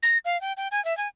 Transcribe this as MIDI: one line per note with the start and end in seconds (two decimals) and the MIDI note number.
0.03 0.18 94
0.25 0.39 77
0.41 0.53 79
0.57 0.68 79
0.71 0.83 80
0.85 0.96 76
0.97 1.08 80